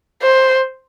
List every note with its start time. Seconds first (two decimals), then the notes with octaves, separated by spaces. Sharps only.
0.22 C5